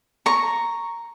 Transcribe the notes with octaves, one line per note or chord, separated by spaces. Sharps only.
A#5 C#6